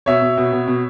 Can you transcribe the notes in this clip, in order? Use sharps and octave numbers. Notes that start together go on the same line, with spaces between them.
B2 C#5 E5
B2
B2
B2
B2